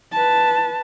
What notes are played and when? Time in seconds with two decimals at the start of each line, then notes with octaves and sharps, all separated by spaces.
0.12 B4 A5